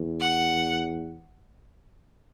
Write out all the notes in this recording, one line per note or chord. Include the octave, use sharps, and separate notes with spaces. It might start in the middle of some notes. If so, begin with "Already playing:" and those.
Already playing: E2
F#5